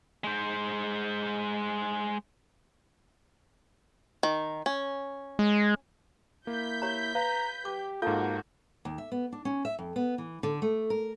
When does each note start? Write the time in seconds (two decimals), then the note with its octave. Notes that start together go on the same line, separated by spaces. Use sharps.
0.24 G#3 C5
4.23 D#3
4.66 C#4
5.39 G#3
6.47 A#3 E4 G6 B6
6.82 G4 C#5 A#5
7.15 B4 F5 A#5
7.65 G4 D6
8.02 G#2 A#3 F4 F#4 A4 F5 A5 G6
8.85 D#2
8.98 E5
9.12 B3
9.32 D4
9.45 C#4
9.65 E5
9.79 F2
9.96 B3
10.18 E3
10.43 D3
10.62 A3
10.90 A#4